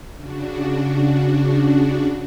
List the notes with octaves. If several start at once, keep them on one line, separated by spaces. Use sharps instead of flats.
C#3 D4 F#4